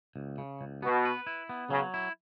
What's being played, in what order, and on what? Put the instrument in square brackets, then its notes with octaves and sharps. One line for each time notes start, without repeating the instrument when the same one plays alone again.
[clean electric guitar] C#2
C#3
C#2
[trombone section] B2 [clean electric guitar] B3
[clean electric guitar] B4
E4
B3
[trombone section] C#3 [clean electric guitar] F#3
[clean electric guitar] E4